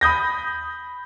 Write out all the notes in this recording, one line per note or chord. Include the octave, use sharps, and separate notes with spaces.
B5 D#6 G6 A#6